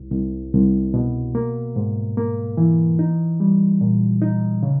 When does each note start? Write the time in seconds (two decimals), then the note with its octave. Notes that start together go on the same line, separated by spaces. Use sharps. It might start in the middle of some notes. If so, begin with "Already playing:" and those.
Already playing: C2
0.12 C2
0.53 C2
0.94 B2
1.35 A#3
1.76 G#2
2.17 A#3
2.57 E3
2.99 D#4
3.40 G3
3.81 A#2
4.22 D#4
4.63 C#3